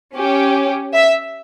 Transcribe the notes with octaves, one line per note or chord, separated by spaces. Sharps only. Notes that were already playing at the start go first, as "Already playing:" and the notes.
C#4 G4
E5